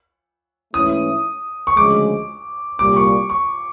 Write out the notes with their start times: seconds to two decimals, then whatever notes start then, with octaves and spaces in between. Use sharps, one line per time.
0.74 G#2 E3 A3 C#4 E4 D#6
1.67 C#6
1.77 D2 C#3 F3 G#3 D6
2.79 C2 A#2 G3 D6
2.96 C#6
3.30 C#6